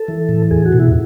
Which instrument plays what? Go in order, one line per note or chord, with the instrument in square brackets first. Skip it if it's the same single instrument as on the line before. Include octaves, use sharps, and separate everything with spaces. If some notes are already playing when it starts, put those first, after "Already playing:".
Already playing: [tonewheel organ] A4
E3
A2
E2 G#4
F#4
B2
E4